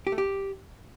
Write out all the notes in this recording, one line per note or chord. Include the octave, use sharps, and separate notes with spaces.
G4
A3
G4